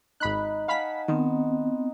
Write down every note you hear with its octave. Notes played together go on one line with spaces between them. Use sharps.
G#1 D#4 B5 F#6
F5 F#5 G#5 A5 B5 B6
D#3 B3 C4 D#4